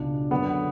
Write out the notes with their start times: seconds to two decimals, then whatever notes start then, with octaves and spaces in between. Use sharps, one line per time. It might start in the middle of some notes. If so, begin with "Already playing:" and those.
Already playing: C#2 B2 D4
0.31 F#2 D3 B3